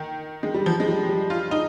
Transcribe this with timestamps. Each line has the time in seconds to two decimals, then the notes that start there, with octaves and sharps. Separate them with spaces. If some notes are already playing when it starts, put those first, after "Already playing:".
Already playing: D#3
0.43 G#3
0.54 G3
0.66 F3
0.80 G#3
0.88 G3
1.09 G3
1.30 F4
1.51 D#4